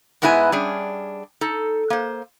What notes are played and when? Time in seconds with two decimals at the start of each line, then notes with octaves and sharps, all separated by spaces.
0.22 G#2 G#3 B3 E4 G4 G#5
0.52 G3 C#4 D4 G#4
1.41 D#4 A4
1.90 A#3 C5